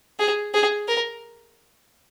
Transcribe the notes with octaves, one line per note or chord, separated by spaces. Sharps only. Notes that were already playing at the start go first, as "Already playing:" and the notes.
G#4
G#4
A#4